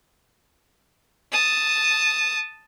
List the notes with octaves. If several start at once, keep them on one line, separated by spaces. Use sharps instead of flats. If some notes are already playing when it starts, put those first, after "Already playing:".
A5 D#6